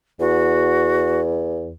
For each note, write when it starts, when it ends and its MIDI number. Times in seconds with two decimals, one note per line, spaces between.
0.20 1.73 40
0.20 1.21 66